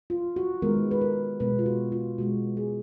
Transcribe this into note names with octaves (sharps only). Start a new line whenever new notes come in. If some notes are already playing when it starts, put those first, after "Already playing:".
F4
F#4
D#3 G#3 B3 A#4
B4
A#4
B2 G#3 B3 B4
F4
F#4
F4
B2 G#3 B3 F#4
G#4